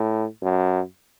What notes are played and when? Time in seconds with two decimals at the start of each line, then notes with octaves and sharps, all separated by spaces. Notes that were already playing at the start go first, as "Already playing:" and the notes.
Already playing: A2
0.42 F#2